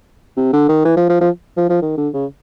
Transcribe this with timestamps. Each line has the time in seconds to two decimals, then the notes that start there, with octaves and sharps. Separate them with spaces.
0.37 C3
0.53 D3
0.69 D#3
0.85 E3
0.97 F3
1.09 F3
1.21 F3
1.57 F3
1.70 F3
1.82 D#3
1.97 D3
2.14 C#3